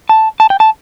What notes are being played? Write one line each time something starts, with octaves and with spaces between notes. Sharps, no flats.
A5
A5
G5
A5